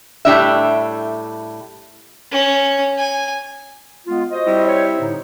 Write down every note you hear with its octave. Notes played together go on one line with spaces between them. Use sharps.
A2 G3 D4 E5
C#4
G#5
G#3 B3 F4
F#4 C5 D#5
G3 C4 E4
C#5
A2 D3 D#4